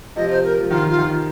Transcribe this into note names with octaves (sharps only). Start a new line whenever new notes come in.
C3 F3 D#5
C5
A#4
F3
D#3 F4
F4
D#3